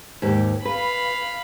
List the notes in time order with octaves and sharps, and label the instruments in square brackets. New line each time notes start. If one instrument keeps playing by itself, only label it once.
[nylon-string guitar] D#2 G#2 G4
[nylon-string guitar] B4 [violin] F5 B5